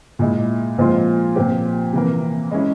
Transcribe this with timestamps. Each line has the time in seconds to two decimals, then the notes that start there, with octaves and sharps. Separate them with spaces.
0.19 A#2 G#3 E4
0.78 A#2 F3 G#3 C4 F4
1.35 A#2 F3 C4 G4
1.93 C3 E3 A#3
2.51 G#3 C#4 E4